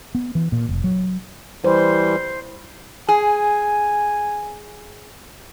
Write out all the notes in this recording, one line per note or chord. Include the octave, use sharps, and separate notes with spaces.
B3
E3
A#2
F1
F#3
E3 G3 C5
G#4 G#5